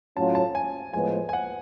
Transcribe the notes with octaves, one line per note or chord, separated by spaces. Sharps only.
A2 F#3 C#4 F4 A5
A5
G#5
A2 F3 G#3 B3 G#5
G#5
F#5